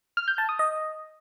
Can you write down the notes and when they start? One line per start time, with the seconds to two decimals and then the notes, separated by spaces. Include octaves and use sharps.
0.17 F6
0.28 G6
0.38 A5
0.49 D#6
0.59 D#5